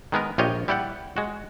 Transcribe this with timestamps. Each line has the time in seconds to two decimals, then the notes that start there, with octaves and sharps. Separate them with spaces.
0.12 D#3 G#3 B3 A#4
0.38 A#1 F4 G4 C#5 D#5
0.68 G3 E4 G4 D5 F#5
1.16 G#3 F#4